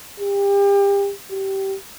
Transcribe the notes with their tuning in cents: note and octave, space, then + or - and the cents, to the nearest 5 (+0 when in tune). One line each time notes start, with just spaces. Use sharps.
G4 +30
G4 -20